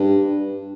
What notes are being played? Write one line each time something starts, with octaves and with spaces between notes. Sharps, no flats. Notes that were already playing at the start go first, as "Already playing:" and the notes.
Already playing: G2